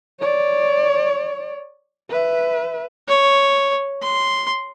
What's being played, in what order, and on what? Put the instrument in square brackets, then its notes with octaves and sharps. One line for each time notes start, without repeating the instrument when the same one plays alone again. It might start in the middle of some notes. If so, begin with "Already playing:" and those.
[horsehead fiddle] C#5 D5
B4 E5
[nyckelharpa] C#5
C6